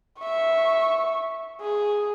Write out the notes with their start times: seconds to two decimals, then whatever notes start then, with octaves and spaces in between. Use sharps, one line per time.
0.20 E5 C#6
1.61 G#4